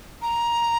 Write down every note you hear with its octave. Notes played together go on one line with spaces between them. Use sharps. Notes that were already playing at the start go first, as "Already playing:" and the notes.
A#5